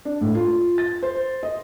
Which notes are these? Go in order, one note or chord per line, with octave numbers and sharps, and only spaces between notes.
D4
A2
F4
A6
C5
D#5